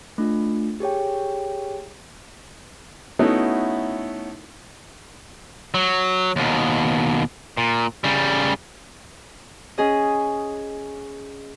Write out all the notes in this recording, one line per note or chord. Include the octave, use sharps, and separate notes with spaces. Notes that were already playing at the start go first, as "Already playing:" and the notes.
A3 D4 F4
G4 G#4 C#5 G5
A3 B3 C#4 D#4 E4 F#4
F#3
D#2 B2
A#2
C#3 G3
C#4 G#4 D#5